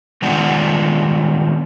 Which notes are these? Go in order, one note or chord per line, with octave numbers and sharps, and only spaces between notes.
D#3 G#3 B3 D4 F4 F#5